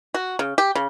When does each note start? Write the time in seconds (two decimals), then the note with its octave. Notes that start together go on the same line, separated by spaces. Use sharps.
0.14 F#4
0.39 C#3
0.58 G4
0.75 C#3